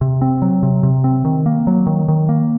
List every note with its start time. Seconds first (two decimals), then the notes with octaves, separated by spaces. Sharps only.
0.01 C3
0.21 C4
0.42 F#3
0.63 C3
0.83 C3
1.04 C4
1.25 D#3
1.46 A#3
1.67 F#3
1.87 D#3
2.08 D#3
2.29 A#3